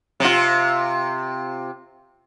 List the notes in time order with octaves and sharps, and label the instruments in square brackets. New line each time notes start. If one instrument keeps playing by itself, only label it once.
[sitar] C3 F4